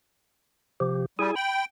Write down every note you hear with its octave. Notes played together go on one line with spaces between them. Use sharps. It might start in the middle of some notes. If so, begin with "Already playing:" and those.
C3 F3 G4
G3 E4 G#4 G#5
G5 B5